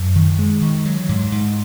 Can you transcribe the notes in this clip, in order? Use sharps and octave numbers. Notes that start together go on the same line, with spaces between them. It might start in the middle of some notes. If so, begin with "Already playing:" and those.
Already playing: F#2
D#3
G#3
D#3
F#3
G#2
G#2